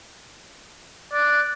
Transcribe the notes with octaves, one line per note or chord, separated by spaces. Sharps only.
D5 F#6